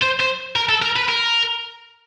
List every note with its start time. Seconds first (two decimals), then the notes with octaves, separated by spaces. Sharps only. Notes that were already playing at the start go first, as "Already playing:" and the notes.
0.02 C5
0.20 C5
0.56 A#4
0.69 A4
0.82 A#4
0.96 B4
1.09 A#4